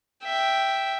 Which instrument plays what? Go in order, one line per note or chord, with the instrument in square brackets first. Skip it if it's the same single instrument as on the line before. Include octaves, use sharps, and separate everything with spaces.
[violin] E5 G5